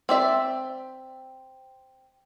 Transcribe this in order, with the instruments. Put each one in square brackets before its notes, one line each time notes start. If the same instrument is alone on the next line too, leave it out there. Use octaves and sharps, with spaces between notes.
[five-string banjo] C4 D5 E5